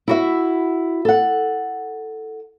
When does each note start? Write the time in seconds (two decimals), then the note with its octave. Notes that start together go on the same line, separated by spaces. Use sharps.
0.08 E4 F#4 E5
1.05 A4 F#5